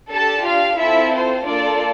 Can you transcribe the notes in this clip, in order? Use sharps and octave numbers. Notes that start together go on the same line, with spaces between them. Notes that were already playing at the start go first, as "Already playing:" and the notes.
D4 G4 A4 A5
F4 F5
C4 E4 F4 A4 E5
C5
A#3 D4 F4 A4 D5